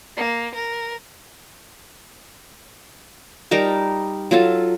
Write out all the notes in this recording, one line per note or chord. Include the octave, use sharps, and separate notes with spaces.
A#3
A#4
G3 D#4 A#4 A5
F#3 F4 A4 A5